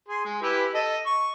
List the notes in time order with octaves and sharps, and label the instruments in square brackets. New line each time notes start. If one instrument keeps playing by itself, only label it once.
[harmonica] G#4 C6
G#3
E4 G4 B4
A4 D#5
C#6